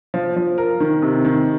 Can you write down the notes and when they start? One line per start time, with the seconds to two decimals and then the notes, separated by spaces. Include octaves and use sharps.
0.14 F3
0.36 F3
0.58 A#4
0.80 D#3
1.02 C3
1.25 D#3